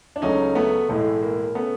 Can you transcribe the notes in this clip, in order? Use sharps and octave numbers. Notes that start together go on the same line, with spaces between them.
D4
C#2 C#3 F#3 A3 C#4 D#4
A3 B3
B1 A2 E3 G#3 A3
A#3
C#3 A3 B3